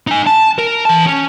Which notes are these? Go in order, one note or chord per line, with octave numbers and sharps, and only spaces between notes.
D#4 G#5
A5
A#4
E3 A5
C#4